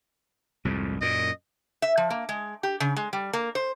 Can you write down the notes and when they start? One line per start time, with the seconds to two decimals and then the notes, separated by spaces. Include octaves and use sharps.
0.65 C2 F2 G#2
1.01 F#2 A#2 D#5
1.82 E5
1.97 F3
2.10 A#3
2.29 G#3
2.63 G4
2.80 C#3
2.97 G#3
3.13 G3
3.33 A#3
3.55 C5